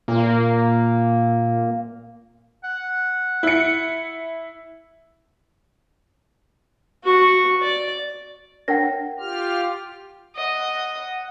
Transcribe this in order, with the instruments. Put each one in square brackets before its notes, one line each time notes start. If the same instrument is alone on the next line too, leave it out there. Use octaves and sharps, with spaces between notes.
[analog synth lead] A#2 [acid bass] A#3
[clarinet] F#5
[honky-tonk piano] E4 C#7
[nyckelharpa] F#4 C#6
D5
[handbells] D4 A#4 C#5 [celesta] F#5 G5 A#6
[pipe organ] F4 G4 F6
[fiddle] D#5 [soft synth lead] F#5